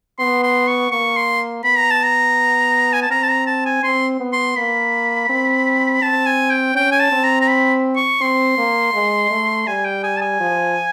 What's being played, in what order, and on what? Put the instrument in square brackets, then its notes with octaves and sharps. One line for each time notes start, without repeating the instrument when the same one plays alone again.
[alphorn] B3 [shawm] C6
[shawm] C6
C#6
[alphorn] A#3 [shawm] C#6
[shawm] C6
[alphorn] B3 [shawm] B5
[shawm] A#5
A5
A#5
G#5
A5
[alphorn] C4 [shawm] A#5
[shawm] A5
A#5
A5
G#5
[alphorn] C4 [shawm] C6
[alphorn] B3
[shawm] C6
[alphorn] A#3 [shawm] B5
[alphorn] C4
[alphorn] C4 [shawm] A5
[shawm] G#5
G5
[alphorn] C#4 [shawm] G5
[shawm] G#5
A5
[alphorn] C4
[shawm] A#5
A#5
B5
C#6
[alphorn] C4 [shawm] C6
[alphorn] A#3
G#3
A3
[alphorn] G3 [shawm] G#5
[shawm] G5
G#5
A5
G#5
[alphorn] F3